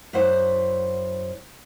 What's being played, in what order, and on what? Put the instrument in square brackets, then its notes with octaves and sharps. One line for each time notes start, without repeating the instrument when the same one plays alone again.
[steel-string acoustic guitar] F#2 E4 C5 F#5